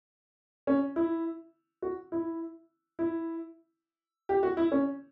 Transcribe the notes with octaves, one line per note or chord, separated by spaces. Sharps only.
C#4
E4
F#4
E4
E4
G4
F#4
E4
C#4